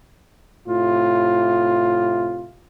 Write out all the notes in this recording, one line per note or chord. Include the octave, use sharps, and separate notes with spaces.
A2 C3 F4